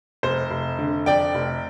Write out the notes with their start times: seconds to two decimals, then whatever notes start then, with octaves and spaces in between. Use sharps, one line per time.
0.23 F1 C5
0.51 F1
0.79 D3
1.06 F2 D5 G5
1.35 F1